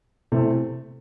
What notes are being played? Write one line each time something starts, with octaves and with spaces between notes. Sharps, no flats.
C3 E3 A3